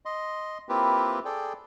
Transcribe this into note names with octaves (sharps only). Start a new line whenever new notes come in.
D#5 C6
A#3 C4 E4 F4 G4 B4
G#4 A4 D5 G5